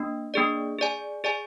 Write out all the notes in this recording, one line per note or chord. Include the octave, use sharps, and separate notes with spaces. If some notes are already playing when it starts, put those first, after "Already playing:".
Already playing: A#3 D4
A#3 D4 G#4 D5
G#4 D5 G#5
G#4 D5 G#5